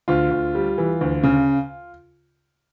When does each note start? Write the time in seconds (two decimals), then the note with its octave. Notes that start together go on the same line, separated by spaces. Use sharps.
0.08 D2 F4
0.31 D2
0.55 G3
0.78 E3
1.01 D2
1.23 C#3